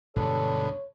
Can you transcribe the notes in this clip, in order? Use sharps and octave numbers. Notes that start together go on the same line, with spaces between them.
D2 G2 B2 G#3 A4 C#5